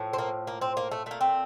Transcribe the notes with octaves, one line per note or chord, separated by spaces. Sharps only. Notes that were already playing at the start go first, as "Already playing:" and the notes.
Already playing: A2 F3
C4
A#3
A#3
C4
A#3
A3
A#2 A3 A#3
C4